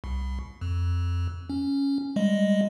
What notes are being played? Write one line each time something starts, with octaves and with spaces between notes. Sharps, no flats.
C2
F2
C#4
G3 G#3 D#5